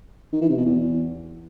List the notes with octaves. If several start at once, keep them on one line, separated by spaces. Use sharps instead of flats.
D#3
E3
C3
B2
E2